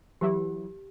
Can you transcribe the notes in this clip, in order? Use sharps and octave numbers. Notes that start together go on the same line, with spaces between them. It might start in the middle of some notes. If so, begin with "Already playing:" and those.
E3 F#3 E4 G4